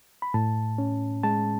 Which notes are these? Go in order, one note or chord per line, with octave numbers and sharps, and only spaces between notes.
B5
A2 A5
C#4
G#3 A5